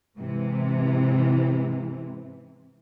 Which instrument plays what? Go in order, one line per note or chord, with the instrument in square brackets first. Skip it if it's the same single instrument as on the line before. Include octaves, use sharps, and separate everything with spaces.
[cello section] G#2 C3 E3